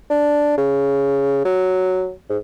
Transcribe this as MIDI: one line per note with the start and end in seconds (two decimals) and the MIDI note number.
0.10 0.55 62
0.58 1.44 49
1.45 2.12 54
2.30 2.37 44